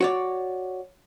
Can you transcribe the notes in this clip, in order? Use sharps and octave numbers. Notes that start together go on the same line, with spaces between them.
F#4 C#5 D5